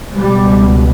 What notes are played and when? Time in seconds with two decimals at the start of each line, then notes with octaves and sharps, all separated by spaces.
0.17 C#2 B2 G3